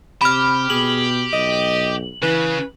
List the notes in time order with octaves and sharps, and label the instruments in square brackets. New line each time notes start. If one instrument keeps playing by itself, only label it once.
[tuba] C3 [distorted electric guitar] G4 [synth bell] B5 F6
[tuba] B2 [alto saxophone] G#4 [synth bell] F#7
[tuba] B1 [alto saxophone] D#5
[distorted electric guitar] C#3 [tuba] E3 [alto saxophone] B4